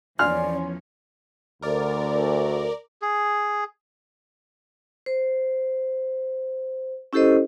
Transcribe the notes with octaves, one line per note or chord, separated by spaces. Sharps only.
E2 F3 C#4 D5 G#5 C6 F6
D2 A#4 D5
G#4
C5
C#4 E4 G4 A4 C5 D#5